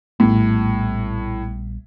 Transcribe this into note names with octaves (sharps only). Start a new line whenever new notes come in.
A#1 A2 G3 B3